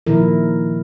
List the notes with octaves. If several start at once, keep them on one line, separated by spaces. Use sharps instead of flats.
A#2 D#3 F3 E4 A#4